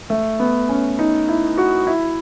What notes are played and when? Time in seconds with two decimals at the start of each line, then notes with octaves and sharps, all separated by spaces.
0.10 A3
0.39 B3
0.69 C#4
0.99 D#4
1.28 E4
1.57 F#4
1.87 E4